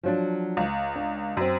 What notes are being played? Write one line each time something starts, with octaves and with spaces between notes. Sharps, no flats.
F3 F#3 D4
C#2
D4
F#2 C4